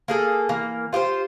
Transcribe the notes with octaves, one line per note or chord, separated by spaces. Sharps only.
A#3 G#4 A4
E3 A#3
F4 G4 A4 C5